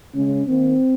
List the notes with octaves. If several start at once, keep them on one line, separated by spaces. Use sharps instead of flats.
C#3 G#3 C#4
D#3 A#3 C4